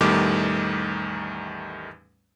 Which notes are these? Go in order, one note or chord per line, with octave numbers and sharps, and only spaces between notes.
A1 E2 D#3 G3 A3 D6